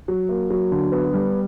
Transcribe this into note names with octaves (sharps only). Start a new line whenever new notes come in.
F#3
A#3
F#3
D3
B3
G3